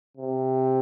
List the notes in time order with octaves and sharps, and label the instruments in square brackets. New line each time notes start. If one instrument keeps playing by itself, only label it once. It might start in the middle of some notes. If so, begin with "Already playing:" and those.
[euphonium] C3